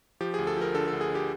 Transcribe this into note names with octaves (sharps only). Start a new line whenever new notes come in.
F3 G4
D2 G#4
A4
F3 A#4
D3 A4
D2 A4
G#4
D3
G4